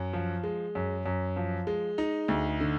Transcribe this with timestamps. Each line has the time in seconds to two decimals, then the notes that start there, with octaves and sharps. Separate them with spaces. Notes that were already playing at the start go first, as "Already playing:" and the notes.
Already playing: F#2
0.13 F3
0.43 G#3
0.75 F#2
1.06 F#2
1.36 F3
1.67 G#3
1.98 D#4
2.28 D2
2.60 D3